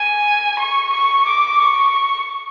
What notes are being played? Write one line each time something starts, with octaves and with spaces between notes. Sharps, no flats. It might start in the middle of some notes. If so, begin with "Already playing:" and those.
Already playing: G#5
C#6
C#6
D6
C#6